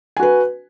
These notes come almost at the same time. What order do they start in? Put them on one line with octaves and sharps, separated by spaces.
G#5 F#4 B4